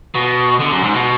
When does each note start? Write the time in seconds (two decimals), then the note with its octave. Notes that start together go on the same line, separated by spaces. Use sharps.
0.15 B2
0.60 D3
0.72 F#2
0.83 G#2
0.94 B2